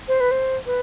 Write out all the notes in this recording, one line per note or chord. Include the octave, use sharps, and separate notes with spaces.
C5
B4
C5
B4